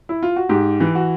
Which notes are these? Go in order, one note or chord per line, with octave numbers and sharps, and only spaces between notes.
E4
F4
F#4
G#2 G4
E3
F#4